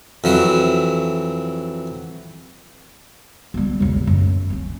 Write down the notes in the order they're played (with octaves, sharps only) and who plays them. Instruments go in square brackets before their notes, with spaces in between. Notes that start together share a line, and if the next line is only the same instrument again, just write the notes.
[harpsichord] F2 E3 F#3
[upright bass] G3 B3
E1 A1
F#2
C4 C#4